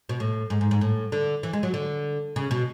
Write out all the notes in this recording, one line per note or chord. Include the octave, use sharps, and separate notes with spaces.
B2
A2
G#2
G#2
G#2
A2
D3
E3
G#3
F#3
D3
C#3
B2